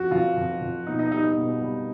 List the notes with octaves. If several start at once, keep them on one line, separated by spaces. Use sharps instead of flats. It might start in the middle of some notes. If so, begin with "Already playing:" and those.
Already playing: F2 F#4
F2 F4
F2
F2
B2 D#4
D#4
G3 D#4
D#4
B2
G3